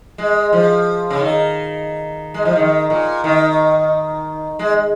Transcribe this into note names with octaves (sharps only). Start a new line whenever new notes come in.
G#3
F3
C#3
D#3
G#3
F3
D#3
A#2
D#3
G#3